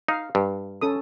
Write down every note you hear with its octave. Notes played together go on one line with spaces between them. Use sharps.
D#4 F5
G2
C#4 A4 D#6